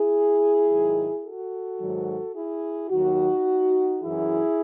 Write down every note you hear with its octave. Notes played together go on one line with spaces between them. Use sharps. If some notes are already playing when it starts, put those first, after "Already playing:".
Already playing: E4 G#4
G#2 D#3 F#3
F#4 A4
G#2 D#3 F#3
E4 G#4
D#2 D#3 F#3 D#4 F#4
F#2 E3 E4 G#4